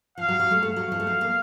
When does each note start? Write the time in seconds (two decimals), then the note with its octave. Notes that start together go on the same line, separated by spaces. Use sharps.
0.18 F3 F5
0.29 F#3
0.40 F#3
0.51 A3
0.63 A3 F5
0.76 F#3
0.92 F3
1.00 A3
1.07 F#3
1.21 A#3